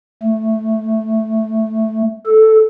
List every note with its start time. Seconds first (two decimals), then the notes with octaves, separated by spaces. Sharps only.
0.23 A3
2.26 A4